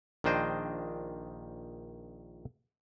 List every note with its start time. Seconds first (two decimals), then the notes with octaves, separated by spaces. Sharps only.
0.24 A#1 D#3 D4 C5 D#5 G5